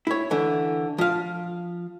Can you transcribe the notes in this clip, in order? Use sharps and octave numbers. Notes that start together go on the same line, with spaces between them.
E4 C#5
D3 E3
F3 F5